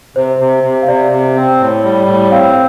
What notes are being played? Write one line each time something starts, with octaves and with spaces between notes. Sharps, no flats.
C3 C5
C3
C3
F5
C3 D5
C3
C4
A2
G3
A2
C4 F5